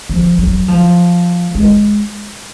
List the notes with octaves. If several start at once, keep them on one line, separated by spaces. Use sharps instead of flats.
F3
F#3
F3
G#3